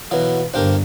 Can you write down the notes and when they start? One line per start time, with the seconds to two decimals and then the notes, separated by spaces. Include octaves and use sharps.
0.11 B2 E3 F#3 B4 F5
0.54 G1 D4 G4 A#4 C5 F5